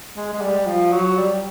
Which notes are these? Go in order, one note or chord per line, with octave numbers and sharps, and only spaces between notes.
G#3
G#3
G3
F3
F#3
G3